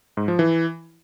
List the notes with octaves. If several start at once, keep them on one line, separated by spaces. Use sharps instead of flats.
G#2
F3
E3